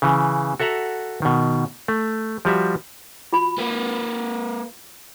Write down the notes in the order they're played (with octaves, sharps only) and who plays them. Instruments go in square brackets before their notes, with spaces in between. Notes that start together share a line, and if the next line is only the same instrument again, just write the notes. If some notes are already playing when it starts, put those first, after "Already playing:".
[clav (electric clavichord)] C#3 E3
F#4 A4 E5 F#5 A#5
B2 D#3
A3
F3 G3 F#4 E5
[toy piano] F4 F#4 B5
[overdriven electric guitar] A#3 B4